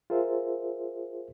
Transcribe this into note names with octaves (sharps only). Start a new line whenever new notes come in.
F4 G#4 A#4 C5 E5